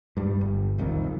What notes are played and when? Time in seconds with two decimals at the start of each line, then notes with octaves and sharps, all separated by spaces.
0.17 G2 G3
0.41 G1
0.78 D#1 C2 F2 D#3
1.04 F#1